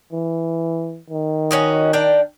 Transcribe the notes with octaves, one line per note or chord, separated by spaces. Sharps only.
E3
D#3
C#4 F#4 D#5
D4 A#4 G5